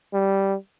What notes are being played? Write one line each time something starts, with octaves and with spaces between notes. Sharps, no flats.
G3